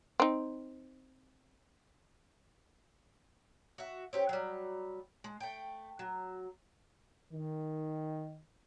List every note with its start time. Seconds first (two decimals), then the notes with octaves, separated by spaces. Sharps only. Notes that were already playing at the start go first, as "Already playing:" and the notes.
0.20 C4 D#4
3.78 F#4 E5
4.13 C4 C#4 G4
4.29 F#3 G3
5.24 G#3
5.40 A3 G5
5.99 F#3
7.32 D#3